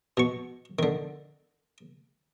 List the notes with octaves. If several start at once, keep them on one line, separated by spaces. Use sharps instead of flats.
B2 C#6
D3 D#3